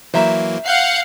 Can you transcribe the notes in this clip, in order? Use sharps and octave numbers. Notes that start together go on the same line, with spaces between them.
E3 F#3 A#3 C5 E5 A#5
F5 F#5 F#6 G6 C7